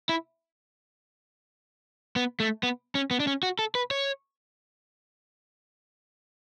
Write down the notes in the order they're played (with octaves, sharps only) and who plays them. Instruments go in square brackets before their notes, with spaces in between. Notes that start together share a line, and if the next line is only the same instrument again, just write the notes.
[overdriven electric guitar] E4
B3
A3
B3
C#4
B3
D4
C#4
F#4
A4
B4
C#5